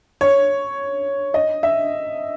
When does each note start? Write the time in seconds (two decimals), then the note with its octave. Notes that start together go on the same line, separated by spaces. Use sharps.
0.21 C#5
1.34 D#5
1.63 E5